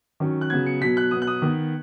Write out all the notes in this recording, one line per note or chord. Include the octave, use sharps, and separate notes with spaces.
D#3 F#3 C#4
F#6
C#3 F#3 B3 G#6
C#7
B2 F#3 B3 B6
F#6
B2 F#3 B3 D#6
F#6
D#6
D#3 B3